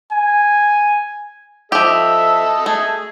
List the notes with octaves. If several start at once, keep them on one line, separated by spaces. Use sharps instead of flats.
G#5
F3 G4 A4 D#5 E5
A3 G#4